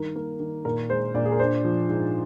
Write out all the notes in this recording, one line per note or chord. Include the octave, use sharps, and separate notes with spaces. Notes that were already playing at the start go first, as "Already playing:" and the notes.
Already playing: G2 D#3 A#4
A#3
D#3
A#2 A#4
G#3 C5
A#2 D5
G#4
A#4
D4 C5
F3
G#2